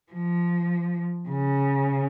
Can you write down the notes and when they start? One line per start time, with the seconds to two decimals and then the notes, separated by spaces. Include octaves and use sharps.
0.12 F3
1.30 C#3